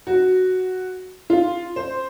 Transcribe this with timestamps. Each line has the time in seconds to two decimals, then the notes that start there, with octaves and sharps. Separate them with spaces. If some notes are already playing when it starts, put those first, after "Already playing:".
0.07 F#4
1.30 F4
1.76 C5